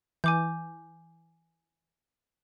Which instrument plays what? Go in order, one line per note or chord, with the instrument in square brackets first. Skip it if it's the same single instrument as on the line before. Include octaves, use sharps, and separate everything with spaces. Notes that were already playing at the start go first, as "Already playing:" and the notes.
[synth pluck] E3 [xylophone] G#5 D6 G6